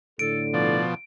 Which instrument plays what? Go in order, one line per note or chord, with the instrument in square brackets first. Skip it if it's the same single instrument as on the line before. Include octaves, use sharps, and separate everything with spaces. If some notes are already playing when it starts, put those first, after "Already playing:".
[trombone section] A2 D3 [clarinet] A4 [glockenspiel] D7
[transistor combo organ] B2 F3 [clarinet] D5